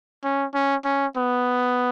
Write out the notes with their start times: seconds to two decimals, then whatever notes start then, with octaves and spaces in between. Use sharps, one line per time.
0.24 C#4
0.54 C#4
0.85 C#4
1.17 B3